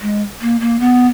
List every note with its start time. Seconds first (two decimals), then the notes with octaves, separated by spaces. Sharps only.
0.02 G#3
0.41 A#3
0.61 A#3
0.80 B3